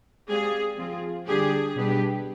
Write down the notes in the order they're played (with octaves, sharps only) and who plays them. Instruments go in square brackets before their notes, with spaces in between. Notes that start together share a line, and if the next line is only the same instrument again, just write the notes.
[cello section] G#3 C4 G4 D5 F5 [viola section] G#4
[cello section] F3 C4 F4 G#4
[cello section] D3 G3 D4 G4 [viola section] G#4
[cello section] B2 G3 D4 G4 B4